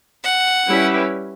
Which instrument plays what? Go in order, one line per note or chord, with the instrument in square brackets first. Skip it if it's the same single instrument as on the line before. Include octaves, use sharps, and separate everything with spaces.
[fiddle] F#5
[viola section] G3 C#4 E4 G4 B4